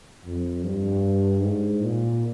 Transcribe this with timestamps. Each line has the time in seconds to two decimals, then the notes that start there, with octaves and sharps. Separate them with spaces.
0.25 F2
0.64 G2
1.42 G#2
1.82 A#2